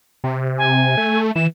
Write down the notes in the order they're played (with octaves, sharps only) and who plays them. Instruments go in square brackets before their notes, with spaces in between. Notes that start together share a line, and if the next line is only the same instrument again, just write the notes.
[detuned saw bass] C3
[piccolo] G#5
[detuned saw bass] A3
[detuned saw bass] E3 [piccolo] E7